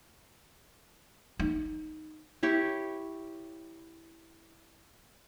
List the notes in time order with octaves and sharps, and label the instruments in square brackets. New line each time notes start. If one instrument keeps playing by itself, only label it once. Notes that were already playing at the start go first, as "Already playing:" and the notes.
[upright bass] D#4
[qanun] E4 G4 C#5